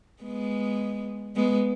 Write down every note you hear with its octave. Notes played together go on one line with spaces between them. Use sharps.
G#3 B3
G#3 B3